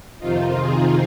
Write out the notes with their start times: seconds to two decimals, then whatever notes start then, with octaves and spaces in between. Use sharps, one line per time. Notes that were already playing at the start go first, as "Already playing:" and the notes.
0.19 F2 C3 D#3 C4 D#4 F4
0.59 G#4